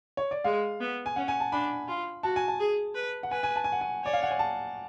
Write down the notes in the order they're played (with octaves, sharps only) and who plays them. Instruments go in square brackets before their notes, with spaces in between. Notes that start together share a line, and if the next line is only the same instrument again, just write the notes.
[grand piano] C#5
D5
[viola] G#3 [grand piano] F5
[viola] B3
[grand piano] G#5
[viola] C#4 [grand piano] F#5
[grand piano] G#5
A5
[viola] D4 [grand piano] B5
[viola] F4
[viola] F#4 [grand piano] A5
[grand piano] G#5
A5
[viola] G#4
B4
[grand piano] F#5
[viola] B4 [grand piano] G#5
[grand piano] G#5
A5
G#5
F#5
G#5
[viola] C#5 [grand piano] D5
[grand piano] F5
F#5
G#5
A5